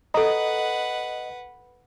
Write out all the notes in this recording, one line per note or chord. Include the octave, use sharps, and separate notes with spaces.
A4 B4 D#5 F#5 A#5